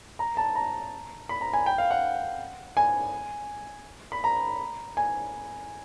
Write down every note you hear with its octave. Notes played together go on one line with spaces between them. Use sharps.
A#5
A5
A#5
B5
A#5
G#5
G5
F5
F#5
G#5
B5
A#5
G#5